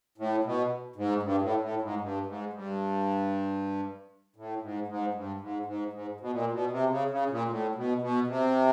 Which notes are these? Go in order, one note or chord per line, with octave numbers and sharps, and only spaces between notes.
A2
B2
G#2
G2
A2
A2
G#2
G2
G#2
G2
A2
G#2
G#2
G2
G#2
G#2
G#2
B2
A#2
B2
C3
C#3
C#3
A#2
A2
B2
B2
C3